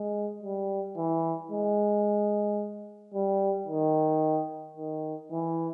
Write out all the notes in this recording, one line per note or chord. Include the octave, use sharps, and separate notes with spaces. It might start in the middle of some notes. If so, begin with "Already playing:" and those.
Already playing: G#3
G3
E3
G#3
G3
D#3
D#3
E3